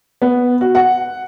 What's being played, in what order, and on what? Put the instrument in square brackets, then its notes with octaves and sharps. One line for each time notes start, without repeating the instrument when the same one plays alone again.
[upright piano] B3
F#4
F#5